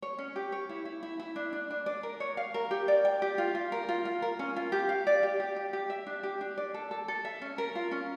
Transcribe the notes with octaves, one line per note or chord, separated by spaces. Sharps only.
C#5
C#4
G4
C#5
E4
E4
E4
E4
D4
D4
D4
D5
A#4
C#5
F5
A#4
G4
D5
G5
G4
F4
F4
A#4
F4
F4
A#4
C#4
F4
G4
F5
D5
G4
G4
G4
G4
E5
D4
G4
D4
D5
A4
A4
A4
E5
C#4
A#4
F4
C#4